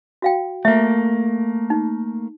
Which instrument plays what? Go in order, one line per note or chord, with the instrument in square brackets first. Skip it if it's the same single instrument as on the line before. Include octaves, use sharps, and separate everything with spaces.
[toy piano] F#4 F5 G5
[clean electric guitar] A3 A#3 [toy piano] E5
[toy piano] D#4